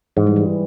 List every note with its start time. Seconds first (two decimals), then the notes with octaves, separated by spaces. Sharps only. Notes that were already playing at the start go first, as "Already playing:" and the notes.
0.17 G#2 E3
0.27 G3
0.36 E3